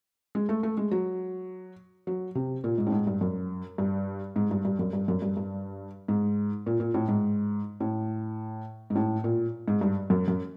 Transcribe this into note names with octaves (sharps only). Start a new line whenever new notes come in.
G#3
A3
A3
G#3
F#3
F#3
C3
A#2
G#2
A2
G#2
G2
F#2
G2
G#2
G2
G2
F#2
G2
F#2
G2
G2
G#2
A#2
A#2
A2
G#2
A2
G#2
A2
A#2
G#2
G2
F#2
F#2